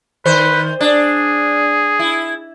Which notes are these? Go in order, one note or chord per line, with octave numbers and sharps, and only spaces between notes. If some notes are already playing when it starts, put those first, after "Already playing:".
D#3 B4 C5
D4 G#4
E4